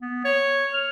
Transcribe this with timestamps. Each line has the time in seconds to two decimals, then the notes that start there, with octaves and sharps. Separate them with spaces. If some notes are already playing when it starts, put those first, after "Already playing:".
0.01 B3
0.25 C#5
0.74 F6